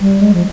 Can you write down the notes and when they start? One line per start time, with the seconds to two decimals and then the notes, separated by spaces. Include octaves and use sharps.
0.01 G3
0.21 G#3
0.34 F3